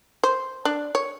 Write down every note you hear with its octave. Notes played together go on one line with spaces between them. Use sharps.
C5
D4
C#5